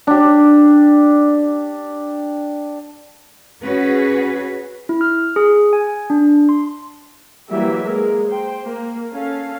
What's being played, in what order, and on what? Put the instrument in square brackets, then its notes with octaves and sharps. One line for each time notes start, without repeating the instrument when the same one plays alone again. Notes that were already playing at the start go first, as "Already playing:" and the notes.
[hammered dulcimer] D4 G4
[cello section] C#4 F#4 G#4 B4
[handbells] E4
F6
G#4
G#5
D4
C6
[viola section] E3 F#3 G3 A#3 G4 E5
G#3 A#3 A#4
C5 G5
A#3
C#4 A4 F5